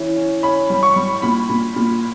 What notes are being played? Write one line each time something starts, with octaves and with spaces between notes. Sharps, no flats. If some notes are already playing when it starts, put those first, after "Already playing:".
Already playing: E3 C#4
C#4
C#4 B5
G3
C#6
G3
A#2 B5
A#2
A#2